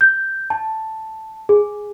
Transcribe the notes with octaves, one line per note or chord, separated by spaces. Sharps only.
G6
A5
G#4